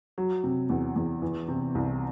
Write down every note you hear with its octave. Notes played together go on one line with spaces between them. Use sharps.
F#3
C3
E2
E2
E3
C3
C2